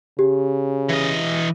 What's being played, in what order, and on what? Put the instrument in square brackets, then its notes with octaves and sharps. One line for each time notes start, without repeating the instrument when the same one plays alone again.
[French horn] C#3 [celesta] G4
[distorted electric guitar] E3 D#5